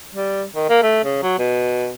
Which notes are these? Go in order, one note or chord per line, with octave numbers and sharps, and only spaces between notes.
G3
D#3
A#3
A3
C#3
F#3
B2